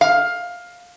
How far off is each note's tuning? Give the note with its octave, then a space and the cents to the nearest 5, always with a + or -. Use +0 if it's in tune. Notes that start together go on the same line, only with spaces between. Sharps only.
F5 +15